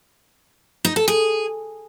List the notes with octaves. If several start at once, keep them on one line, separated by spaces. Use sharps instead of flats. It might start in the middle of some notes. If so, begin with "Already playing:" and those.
D#4
A4
G#4